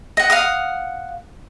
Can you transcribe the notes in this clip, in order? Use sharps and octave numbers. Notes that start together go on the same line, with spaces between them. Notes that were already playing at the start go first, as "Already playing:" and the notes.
D#5 F#5
F5 F#5 D#6